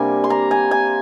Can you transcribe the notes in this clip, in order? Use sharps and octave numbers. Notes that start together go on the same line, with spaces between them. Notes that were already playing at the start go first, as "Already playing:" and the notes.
Already playing: C3 G3 A#3 D4 G#5
C6
A#5
G#5
G#5